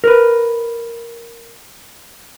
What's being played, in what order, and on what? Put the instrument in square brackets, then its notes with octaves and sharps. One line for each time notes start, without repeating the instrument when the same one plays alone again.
[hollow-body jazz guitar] A#4 B4